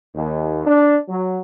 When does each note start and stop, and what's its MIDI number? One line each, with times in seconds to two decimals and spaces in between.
0.15 0.64 39
0.66 0.96 62
1.09 1.39 54